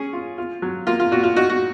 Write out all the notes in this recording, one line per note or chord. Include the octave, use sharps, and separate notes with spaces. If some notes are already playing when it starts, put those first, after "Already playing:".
Already playing: C#4 G#4
F4
F4
F#3
A#3 F4
F4
A#2 F#4
F4
D#4 F#4
F#4